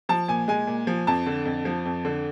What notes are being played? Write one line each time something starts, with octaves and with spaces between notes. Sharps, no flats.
F3 A5
A#2 G#5
G#3 G#5
A#2
F3
F2 A5
D3
F2
F3
F2
D3